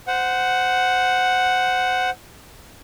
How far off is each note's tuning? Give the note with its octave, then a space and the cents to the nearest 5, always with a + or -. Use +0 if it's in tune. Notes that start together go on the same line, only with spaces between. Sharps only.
C5 -15 F#5 +0